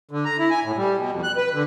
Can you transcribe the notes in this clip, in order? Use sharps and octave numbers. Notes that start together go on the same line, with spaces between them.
D3
A#5
E4
G#5
A2
G3
B2
F2
F#6
B4
D3